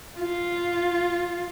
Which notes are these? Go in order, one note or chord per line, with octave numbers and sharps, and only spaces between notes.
F4